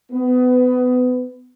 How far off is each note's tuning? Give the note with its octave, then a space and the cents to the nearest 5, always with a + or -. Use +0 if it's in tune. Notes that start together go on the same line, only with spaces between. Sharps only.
B3 +25